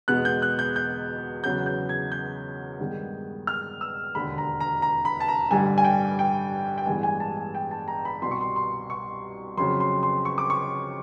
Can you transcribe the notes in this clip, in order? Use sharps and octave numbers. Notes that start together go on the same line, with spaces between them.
E2 B2 G#3 B3 F#6
G6
F#6
G6
G6
E2 C#3 F#3 B3 G6
G6
G#6
G6
G2 D#3 G#3 B3
F6
E6
E1 D#2 D3 B5
A#5
A#5
A#5
B5
A5
A#5
A1 G2 D3 G3 G#5
G#5
G5
G5
G5
A1 G2 E3 G#3 B3 G#5
G#5
A5
G#5
G5
A5
A#5
B5
C2 B2 G3 C6
C#6
C6
C6
C#6
F2 C#3 F#3 C6
C6
C6
C#6
D6
C#6